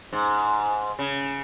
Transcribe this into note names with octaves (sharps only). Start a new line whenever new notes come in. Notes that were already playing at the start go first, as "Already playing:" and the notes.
G#2
C#3